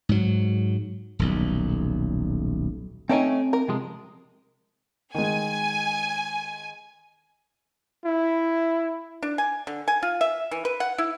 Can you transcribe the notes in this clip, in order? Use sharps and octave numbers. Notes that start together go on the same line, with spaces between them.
G#2 F#3
D#1 B1
A3 C4 C#4 D#4 G5 G#5
A#4
C3 F3 G#3
D#3 G#3 G#5
E4
D4
G#5
D3
G#5
F4
E5
E3
B4
F#5
E4